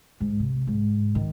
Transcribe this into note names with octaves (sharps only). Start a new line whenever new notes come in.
G#2
C3
G#2
D#3